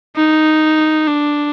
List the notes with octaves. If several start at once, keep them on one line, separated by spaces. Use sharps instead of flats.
D#4
D4